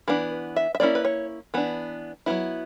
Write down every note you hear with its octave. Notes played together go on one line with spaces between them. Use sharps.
E3 B3 D4 B4
E5
E5
A#3 C#4 E4 D5
B4
C#5
E3 B3 D4
F#3 B3 E4